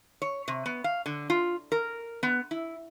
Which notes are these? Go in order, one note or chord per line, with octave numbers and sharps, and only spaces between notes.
C#5
C3
B3
F5
D3
F4
A#4
B3
E4